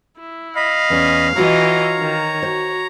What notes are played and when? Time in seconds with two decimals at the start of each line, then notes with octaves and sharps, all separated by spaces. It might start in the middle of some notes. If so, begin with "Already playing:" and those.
0.19 E4
0.56 D#5 F5 B5
0.90 E2 C#4 D5
1.36 E3 F4 F#4 C#5 D#5 F#5 A#5
1.99 D#3
2.43 F#4 C5